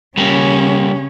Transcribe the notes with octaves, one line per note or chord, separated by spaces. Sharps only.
C#3 G3 A#3 C#4